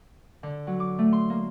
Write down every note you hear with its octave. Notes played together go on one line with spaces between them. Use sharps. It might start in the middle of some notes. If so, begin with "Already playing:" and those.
D3
F#3
D6
A3
C6
A#3